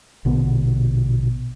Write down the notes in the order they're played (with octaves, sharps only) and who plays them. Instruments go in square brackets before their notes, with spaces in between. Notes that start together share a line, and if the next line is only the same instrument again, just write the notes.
[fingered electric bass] A#1 B2 D3 B3